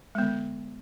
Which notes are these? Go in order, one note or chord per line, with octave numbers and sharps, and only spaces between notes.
D3 G#3 B3